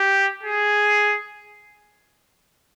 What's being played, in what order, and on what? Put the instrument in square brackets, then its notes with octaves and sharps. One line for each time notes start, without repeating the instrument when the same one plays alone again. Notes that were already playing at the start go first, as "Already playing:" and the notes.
Already playing: [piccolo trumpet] G4
G#4